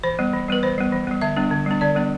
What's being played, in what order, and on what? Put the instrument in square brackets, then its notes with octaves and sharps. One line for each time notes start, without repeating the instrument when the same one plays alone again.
[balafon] E3 C5
G3 B3
E3
G3 B3 B4
E3 C5
G3 B3
E3
G3 B3
D3 E5
G3 B3 D4
D3
G3 B3 D4
D3 D5
G3 B3 D4